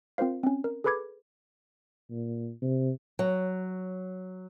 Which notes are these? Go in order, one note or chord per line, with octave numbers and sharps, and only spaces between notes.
C4 F4 A#4 C5 F5
C4 C#4
A#4
G#4 A4 B4 B5 D6 G#6
A#2
C3
F#3